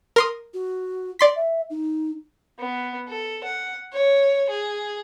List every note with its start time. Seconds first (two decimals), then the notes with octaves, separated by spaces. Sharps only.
0.16 A#4 C6 D#6
0.54 F#4
1.19 D5 C6 B6
1.36 E5
1.70 D#4
2.59 B3
3.08 A4
3.44 F#5
3.93 C#5
4.49 G#4